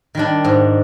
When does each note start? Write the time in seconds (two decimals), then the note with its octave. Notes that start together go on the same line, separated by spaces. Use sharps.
0.15 D#3 G3 D4
0.45 G#2